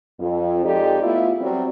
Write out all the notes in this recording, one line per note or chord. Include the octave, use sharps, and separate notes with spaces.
F2
F2 G#3 D#4 G4 A4 D5
A3 B3 E4 F4
F#3 G3 C4